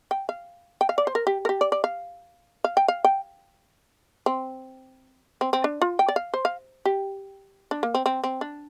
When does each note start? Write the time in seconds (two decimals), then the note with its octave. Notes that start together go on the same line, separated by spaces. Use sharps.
0.11 G5
0.29 F5
0.81 G5
0.89 F5
0.98 D5
1.07 C5
1.15 A#4
1.27 G4
1.45 A#4
1.49 G4
1.61 D5
1.72 D5
1.84 F5
2.64 F5
2.77 G5
2.88 F5
3.05 G5
4.26 C4
5.41 C4
5.53 C4
5.64 D4
5.82 F4
5.99 G5
6.08 D5
6.16 F5
6.34 C5
6.45 F5
6.85 G4
7.71 D4
7.83 A#3
7.95 C4
8.06 C4
8.24 C4
8.41 D4